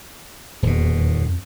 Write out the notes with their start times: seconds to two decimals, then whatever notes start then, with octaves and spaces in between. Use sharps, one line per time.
0.63 D#1 E2 B2
1.24 F2